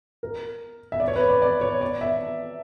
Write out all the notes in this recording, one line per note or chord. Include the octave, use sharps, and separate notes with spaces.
A#4
E5
D5
C#5
B4
D5
D5
C#5
D5
E5